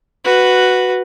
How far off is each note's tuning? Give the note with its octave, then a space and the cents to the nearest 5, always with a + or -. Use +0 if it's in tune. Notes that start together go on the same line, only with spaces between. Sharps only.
F#4 +0 B4 +0